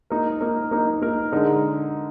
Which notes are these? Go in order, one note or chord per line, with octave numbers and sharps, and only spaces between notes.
A#3 D#4 A#4
A#3 D#4 A#4
A#3 D#4 A#4
A#3 D#4 A#4
D3 G#3 D#4 A#4